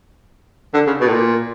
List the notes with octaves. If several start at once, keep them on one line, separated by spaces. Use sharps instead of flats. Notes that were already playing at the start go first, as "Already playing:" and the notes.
D3
C#3
B2
A2
A#2